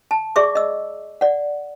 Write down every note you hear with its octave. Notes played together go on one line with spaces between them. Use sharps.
A5
G#4 D5 E5 C#6 D6
D#5 E6
D5 F#5